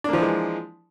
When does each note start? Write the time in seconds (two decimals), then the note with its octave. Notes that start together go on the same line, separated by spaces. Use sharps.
0.04 D4
0.09 A#3
0.13 F3
0.18 E3
0.22 G#3